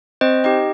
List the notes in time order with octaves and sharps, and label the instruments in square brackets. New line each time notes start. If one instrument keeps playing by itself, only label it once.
[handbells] C4 C5 D#5
D#4 G4 D#5 G5